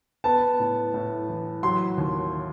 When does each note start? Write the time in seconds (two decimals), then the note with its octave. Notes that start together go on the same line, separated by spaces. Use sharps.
0.24 B3 A5
0.59 A2
0.94 A2
1.29 E3
1.63 F#3 C6
1.98 D#2